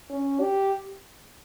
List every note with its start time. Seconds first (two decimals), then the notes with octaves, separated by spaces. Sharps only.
0.11 C#4
0.41 G4